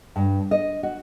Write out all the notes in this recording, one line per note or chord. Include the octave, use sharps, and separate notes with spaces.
G2
D#5
F#4